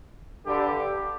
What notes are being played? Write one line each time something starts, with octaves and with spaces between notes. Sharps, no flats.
G2 D3 G3 G4